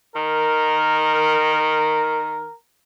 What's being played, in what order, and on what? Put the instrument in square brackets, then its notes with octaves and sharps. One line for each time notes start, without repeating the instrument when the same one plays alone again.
[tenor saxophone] D#3 [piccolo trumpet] A#4